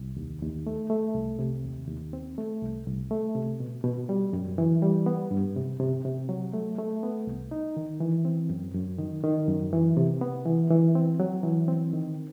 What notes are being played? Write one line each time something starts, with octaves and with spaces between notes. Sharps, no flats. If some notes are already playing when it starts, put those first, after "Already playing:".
Already playing: C2
D#2
D#2
A3
A3
C2
C3
D#2
D#2
C4
A3
C2
C2
A3
C3
B2
B2
G3
F#2
E3
G3
B3
G2
C3
C3
C3
F#3
A3
A3
B3
C2
D#4
D#3
E3
C4
F#2
F#2
D#3
D#3
F#2
E3
C3
B3
E3
E3
C4
F#3
E3
C4
D#3